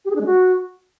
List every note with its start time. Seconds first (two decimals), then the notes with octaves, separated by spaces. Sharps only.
0.05 G4
0.10 G#4
0.16 D4
0.21 G#3
0.26 F#4